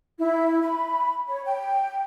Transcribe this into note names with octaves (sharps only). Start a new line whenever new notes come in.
E4
B5
C#5
G5